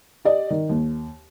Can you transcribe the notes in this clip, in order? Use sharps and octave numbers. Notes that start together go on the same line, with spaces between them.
G4 D5 D#5
D#3
D#2